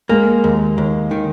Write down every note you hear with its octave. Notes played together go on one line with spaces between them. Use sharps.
G#3 A#3
D#2
D#2
D#3